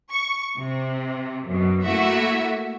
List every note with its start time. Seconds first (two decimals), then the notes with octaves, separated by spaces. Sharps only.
0.12 C#6
0.57 C3
1.48 F#2 B2
1.84 A3 A#3 E4 F#4 E5